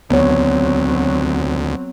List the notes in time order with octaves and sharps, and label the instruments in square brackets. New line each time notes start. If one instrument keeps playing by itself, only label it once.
[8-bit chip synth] D2 [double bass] F#3 C4 [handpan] B3 C#5